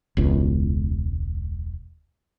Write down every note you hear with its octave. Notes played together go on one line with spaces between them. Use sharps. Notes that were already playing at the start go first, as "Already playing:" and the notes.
E1 C#2